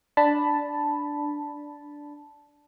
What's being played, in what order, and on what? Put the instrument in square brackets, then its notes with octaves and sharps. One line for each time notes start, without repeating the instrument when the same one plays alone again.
[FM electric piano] D4 A5 B5